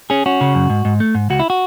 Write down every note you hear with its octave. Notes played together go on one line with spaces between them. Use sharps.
C#4 G#4
C#4 F#4
C#3
F#2
G#2
G#2
A3
G#2
C#2 F#4
E4
F#4